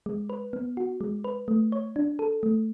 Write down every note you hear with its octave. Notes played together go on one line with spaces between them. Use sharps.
G#3
B4
B3
F#4
G#3
B4
A3
C#5
D4
A4
A3